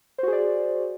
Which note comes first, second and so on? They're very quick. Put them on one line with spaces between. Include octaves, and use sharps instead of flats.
C5 F#4 G#4 D5